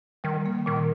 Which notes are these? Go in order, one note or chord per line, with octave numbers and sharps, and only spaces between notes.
D#3 G3
A#3
A#2 D#3